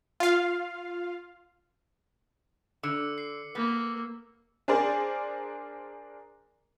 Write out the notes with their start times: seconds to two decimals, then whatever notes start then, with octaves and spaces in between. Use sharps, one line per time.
0.20 F4 F5
2.83 D3 D6 E6 C#7
3.18 C7
3.55 A#3 B3
4.68 D4 G#4 A#4 C5 D5